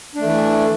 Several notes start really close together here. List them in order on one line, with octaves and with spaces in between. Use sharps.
D4 A3 E3